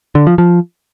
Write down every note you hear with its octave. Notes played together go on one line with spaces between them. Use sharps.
D3
F3
F3